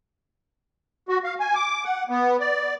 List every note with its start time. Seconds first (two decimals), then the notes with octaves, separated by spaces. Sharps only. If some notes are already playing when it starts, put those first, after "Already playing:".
1.09 F#4
1.24 F5
1.40 G#5
1.55 D6
1.84 F#5
2.09 B3
2.40 D5